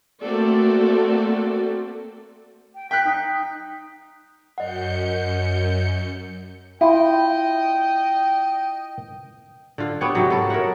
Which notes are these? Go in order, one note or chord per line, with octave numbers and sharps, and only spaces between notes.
A3 A#3 C4 F#4 A4 D5
G5
G5 F#6 B6
D#4
F#2 D#5 F#5 G6 C#7
E4 F4 D#5 G5
D3 F4
B3 C4 G4 C#5
G#2 C3 F#3
B3 A4 A#4
A#4 C#5 E5 F#5